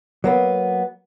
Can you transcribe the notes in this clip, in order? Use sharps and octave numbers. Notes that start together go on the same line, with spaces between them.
F#3 A#3 B3